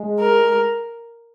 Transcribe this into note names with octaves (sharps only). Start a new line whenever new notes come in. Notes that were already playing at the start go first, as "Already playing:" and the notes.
Already playing: G#3
A#4